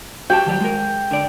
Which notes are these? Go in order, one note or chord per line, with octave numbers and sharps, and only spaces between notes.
F#4 G4 G5 A5
D#3 F#3 G3
G#3 A#4
D3 D5